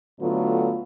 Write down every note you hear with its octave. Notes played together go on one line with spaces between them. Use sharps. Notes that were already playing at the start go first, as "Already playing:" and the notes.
A2 D3 F#3 B3 F4